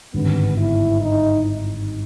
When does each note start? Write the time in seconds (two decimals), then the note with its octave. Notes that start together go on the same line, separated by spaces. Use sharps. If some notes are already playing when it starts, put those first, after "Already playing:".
0.14 G#1 G2 D3 B3
0.57 E4
1.01 D#4